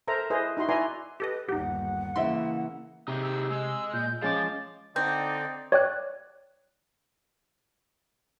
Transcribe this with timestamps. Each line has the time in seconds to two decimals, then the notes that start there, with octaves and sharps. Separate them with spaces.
0.08 A4 A#4 C5 E5 A#5
0.30 E4 G#4 B4 C5 D#5
0.57 D#4 E4 F#4 C6
0.69 E4 B4 D5 G#5 A#5 C6
1.20 G4 A4 B4 D#5
1.49 G1 D#2 D#4 G4 F#5
2.16 C#3 E3 A#3 E4 E5 C6
3.08 C3 D#4 G4 G#4
3.23 E6
3.51 G#3 E6
3.93 A#2 G6
4.22 F3 G#3 C#4 D6 A6
4.96 D3 C4 D#4 D5 G6
5.72 C#5 D5 G5 F#6